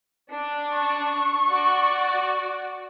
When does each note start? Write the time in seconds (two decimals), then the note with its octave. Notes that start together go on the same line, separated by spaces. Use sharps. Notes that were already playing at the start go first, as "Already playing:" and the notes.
0.31 D4
0.71 C#6
1.48 F#4 D5